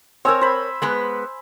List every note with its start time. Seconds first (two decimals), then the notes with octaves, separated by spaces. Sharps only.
0.25 C4 A#4 C#5 G#5 E6
0.41 C5 B5
0.82 G#3 B3 B4